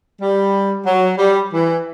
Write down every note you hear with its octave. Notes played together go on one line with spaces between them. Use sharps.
G3
F#3
G3
E3